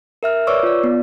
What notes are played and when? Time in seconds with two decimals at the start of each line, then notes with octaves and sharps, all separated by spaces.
0.23 A#4 E5 F6
0.47 B4 C#5 D5 C#6 D6 E6
0.63 F4 D5
0.84 B3